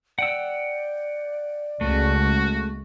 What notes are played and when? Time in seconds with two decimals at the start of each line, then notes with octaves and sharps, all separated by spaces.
0.19 D5 F#5 G5 E6
1.81 C#2 A3 F#4